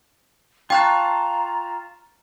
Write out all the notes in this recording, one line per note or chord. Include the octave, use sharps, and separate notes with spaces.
F4 F5 G5 A5 A#5 C#6 F#6